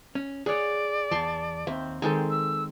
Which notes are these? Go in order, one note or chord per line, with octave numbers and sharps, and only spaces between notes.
C#4
G#4 C#5 D5 F#5
E2 A5 C6 C#6
D#2 C4 E5
D#3 G#3 C4 A4 G#5
E6